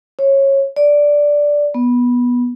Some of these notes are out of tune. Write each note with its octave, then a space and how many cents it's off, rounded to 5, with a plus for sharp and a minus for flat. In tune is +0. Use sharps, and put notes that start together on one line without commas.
C#5 -20
D5 -5
B3 -15